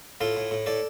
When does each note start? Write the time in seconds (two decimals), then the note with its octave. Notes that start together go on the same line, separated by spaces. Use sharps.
0.21 A2 F4 A4
0.37 A2
0.51 A2
0.66 A2 A4 D5